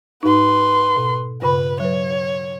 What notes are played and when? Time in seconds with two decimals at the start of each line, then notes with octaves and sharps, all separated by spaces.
0.23 G#2 D#4 B4 C6
0.97 B2
1.42 G2 C#3 B4 B5
1.80 F#3 B4 C#5